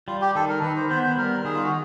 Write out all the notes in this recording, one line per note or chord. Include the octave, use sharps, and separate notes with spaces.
G3 F4
G4
D#3 A4
A#4
D#3 B4
C5
B3 C5
C5
G3 A#4
D#3 G#4
F4
F#4